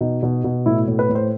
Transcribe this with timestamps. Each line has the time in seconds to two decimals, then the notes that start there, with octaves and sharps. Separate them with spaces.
0.01 B2 D#4
0.23 B2
0.44 B2
0.66 A2 E4
0.88 A2
0.99 B4
1.09 A2
1.15 C5